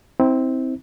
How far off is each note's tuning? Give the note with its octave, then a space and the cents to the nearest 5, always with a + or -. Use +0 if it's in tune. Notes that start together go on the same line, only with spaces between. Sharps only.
C4 +0 E4 -40